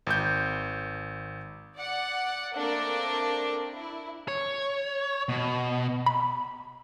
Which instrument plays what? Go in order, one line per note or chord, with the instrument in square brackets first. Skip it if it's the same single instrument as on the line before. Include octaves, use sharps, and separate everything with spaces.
[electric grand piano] G#1 G6
[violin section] D5 F#5
A3 A#3 C4 D4 A#4
E4
[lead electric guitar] C#5
B2
[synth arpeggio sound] B5